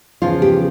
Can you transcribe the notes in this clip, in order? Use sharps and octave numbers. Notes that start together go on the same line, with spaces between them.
E2 C#3 F3 F4
G4